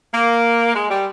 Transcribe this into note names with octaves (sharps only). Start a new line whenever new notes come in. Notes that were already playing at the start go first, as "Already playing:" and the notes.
A#3
G#3
G3